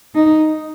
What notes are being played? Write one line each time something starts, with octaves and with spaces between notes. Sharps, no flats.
D#4